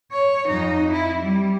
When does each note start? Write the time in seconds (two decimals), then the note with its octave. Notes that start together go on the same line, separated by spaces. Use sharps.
0.12 C#5
0.48 F2 D#4
0.92 E4
1.22 G3